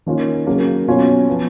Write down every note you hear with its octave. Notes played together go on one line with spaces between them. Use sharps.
D#3 A#3 C#4 F4
C#3 F#3 A#3
B2 F#3 C#4 F4
F3 B3 F4